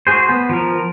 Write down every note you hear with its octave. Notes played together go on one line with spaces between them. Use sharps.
F#4 G#4 C5
B3
F3 A#4